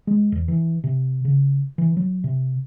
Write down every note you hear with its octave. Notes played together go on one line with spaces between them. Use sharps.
G#3
E2
E3
C3
C#3
E3
F#3
C3